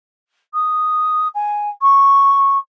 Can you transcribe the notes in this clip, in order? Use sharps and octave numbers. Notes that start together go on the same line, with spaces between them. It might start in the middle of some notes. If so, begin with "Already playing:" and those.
D#6
G#5
C#6